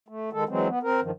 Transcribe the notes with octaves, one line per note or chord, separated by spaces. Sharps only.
A3
D#3 G#3 A4
E3 F#3 G#3 C4
B3
C4 A#4
G2 D#3 F3